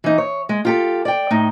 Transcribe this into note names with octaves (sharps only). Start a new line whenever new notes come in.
E3 D#4
C#5
G#3
F4 G4 A4
D5 G5
A2 D#4